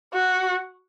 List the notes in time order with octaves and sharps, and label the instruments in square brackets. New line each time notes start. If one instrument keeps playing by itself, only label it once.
[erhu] F#4